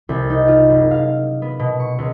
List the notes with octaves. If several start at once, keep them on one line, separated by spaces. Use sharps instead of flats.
C2
D#4
F4
F#1
F5
B3
B2
C#6
C#2